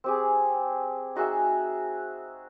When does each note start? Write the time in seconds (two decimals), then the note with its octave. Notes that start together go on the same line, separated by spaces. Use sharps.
0.04 C4 G4 G#4
1.15 D#4 F#4 G#4 E5